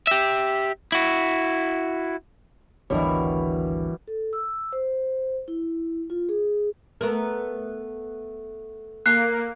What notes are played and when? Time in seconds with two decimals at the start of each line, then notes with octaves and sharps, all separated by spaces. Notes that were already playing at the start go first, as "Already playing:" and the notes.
0.07 G4 E5
0.92 E4 F#4
2.90 G#1 D2 B2 E3 G3 D4 A#4 C#5
4.08 A4
4.33 E6
4.73 C5
5.48 E4
6.10 F4
6.29 G#4
7.01 A3 B3 A#4
9.06 A#3 F#6 C7